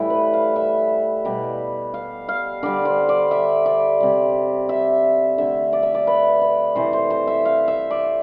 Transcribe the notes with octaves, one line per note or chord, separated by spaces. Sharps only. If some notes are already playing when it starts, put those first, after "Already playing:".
Already playing: A2 E3 G3 E4
B4
F5
E5
B2 G3
F5
F5
D3 G3 D5
C5
D5
E5
D5
C3 G3
E5
D3 A3 E5
D5
E5
D5
B4
B4
C3 E3 A3 C5
C5
C5
E5
F5
E5
D5